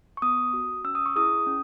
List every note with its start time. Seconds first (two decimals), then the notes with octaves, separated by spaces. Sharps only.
0.17 C#6
0.22 B3 D#6
0.53 F#4
0.84 C#4 E6
0.95 D#6
1.06 C#6
1.16 E4 G#4 D#6
1.47 C#4